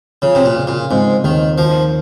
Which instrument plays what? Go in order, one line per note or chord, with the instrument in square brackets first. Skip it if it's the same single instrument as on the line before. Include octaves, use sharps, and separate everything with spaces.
[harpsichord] C#3 [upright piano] F3
[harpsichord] C3
A#2
[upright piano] C#3
[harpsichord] A#2
[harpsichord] G#2 [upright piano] C4
[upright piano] D#2 [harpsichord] D#3
[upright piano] D#3 [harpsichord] F3